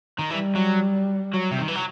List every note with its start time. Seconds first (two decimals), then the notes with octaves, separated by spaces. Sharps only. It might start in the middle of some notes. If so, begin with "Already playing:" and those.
0.19 D#3
0.30 E3 G3
0.56 F#3
1.33 F#3
1.51 C3
1.59 D#3
1.68 E3
1.76 F#3